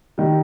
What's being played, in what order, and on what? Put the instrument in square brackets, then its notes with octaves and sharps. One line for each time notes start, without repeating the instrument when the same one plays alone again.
[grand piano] D#3 G3